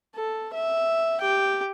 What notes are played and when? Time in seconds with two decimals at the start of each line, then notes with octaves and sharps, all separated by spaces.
0.15 A4
0.54 E5
1.21 G4 G5